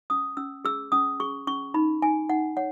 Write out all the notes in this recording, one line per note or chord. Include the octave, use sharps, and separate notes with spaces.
C#4 D#6
C#4 E6
G#4 E6
C#4 D#6
G#4 C#6
C#4 C#6
D#4 B5
D#4 G#5
D#4 F#5
C#5 F#5